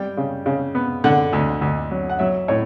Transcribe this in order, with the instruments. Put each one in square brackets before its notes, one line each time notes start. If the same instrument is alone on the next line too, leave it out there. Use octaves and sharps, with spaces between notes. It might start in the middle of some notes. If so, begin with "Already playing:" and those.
Already playing: [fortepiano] G3 G5
C#3
C#3
B3
D3 F#5
D2
D2
F#3
F#5
F#3 E5
A2 C#5